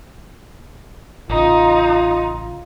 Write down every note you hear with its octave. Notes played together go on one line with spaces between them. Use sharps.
A1 C#3 D#4 F4